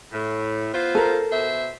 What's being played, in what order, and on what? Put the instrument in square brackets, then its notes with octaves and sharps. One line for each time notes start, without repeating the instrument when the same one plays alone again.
[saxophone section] A2
B3 F4 C5
[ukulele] A4 A#4
[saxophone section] B2 C5 E5